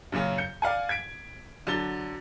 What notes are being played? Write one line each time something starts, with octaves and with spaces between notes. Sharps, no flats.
F#2 A#2 C#3 C#4
G6 C#7
D5 F5 F#5 G#5
G#6 B6 D7
D3 F#3 A6 G7